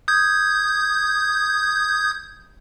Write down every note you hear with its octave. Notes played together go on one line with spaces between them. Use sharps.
D#6 G6 G#6